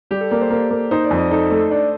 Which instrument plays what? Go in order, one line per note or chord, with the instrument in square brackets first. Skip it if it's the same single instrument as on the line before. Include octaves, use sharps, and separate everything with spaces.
[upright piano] G3 [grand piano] G4
[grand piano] A4
[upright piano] A#3 [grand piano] D5
[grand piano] C5
[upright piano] A#3
A#3
[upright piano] D#4 [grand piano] C5
[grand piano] D5
[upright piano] F2
[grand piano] D#5
[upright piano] D#4 [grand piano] A4
[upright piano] A3
D4